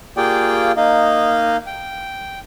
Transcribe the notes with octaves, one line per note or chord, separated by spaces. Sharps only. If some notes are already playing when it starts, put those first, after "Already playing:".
A#3 F4 G4 G#4 D5 G5
A#3 D#4 D#5 F5
G5